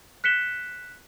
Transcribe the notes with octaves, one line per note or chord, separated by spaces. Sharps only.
F#6 B6 C#7 E7 G7